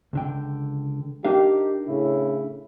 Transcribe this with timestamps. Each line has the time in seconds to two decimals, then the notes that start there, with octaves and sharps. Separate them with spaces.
0.13 C#2 D3 G5
1.25 D4 D#4 G4 A#4 F5
1.86 A2 C#3 E4